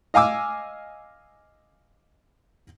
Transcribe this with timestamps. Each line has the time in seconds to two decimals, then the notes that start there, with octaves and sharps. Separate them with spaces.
0.14 D#5 F5 G#5 D6 E6